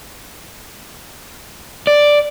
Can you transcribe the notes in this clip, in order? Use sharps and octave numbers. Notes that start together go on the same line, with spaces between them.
D5